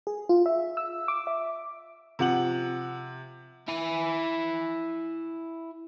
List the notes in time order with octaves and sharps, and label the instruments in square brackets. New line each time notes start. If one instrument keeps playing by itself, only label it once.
[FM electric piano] G#4
F4
E5
E6
D6
E5
[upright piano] C3 F3 F#5 F#7
[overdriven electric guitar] E4 G#5